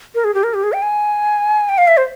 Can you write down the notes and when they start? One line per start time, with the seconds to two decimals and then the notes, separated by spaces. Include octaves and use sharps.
0.15 A#4
0.24 G#4
0.34 G4
0.43 A#4
0.54 G4
0.63 G#4
0.73 G5
0.82 G#5
1.69 G5
1.78 F5
1.88 E5
1.97 C5